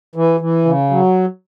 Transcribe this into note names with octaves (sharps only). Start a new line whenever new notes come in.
E3
E3
C#3
F#3